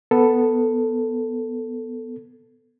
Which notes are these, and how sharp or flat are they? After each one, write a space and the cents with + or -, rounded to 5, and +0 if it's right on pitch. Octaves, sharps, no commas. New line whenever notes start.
B3 +0 A4 +5